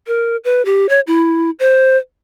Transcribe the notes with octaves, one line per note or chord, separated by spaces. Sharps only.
A#4
B4
G4
C#5
E4
C5